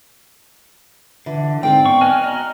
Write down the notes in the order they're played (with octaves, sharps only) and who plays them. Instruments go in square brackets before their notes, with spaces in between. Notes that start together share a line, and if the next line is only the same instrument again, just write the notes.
[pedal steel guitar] D3 [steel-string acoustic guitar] E3
[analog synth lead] G#2 [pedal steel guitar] C4 [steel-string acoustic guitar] D5 F5 G5
[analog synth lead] B3 [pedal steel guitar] C#6
[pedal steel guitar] B4 D#5 G#5 [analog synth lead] F6
[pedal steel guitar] F#4 D#5 A#5